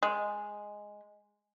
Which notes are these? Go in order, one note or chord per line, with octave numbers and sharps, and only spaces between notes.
G#3